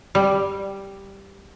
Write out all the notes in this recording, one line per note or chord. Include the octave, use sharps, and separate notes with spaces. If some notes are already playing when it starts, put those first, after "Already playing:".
G3